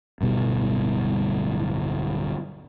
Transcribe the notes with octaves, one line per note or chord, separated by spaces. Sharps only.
D1 G1 B2 G3